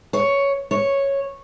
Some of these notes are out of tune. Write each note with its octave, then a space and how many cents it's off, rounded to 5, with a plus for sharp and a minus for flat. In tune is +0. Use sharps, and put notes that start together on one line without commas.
C#5 +5
C#5 -5